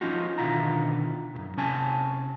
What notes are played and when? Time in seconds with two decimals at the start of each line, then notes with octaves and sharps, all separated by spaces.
0.01 F3 C#4 D#4 F4 F#4
0.38 B2 D3 D#3 E4 F4 A#5
1.35 C2 F#2
1.57 C3 C#4 G#5 A5